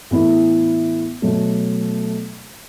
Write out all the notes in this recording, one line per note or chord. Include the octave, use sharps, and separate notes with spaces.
A2 E3 B3 E4
B2 F#3 A3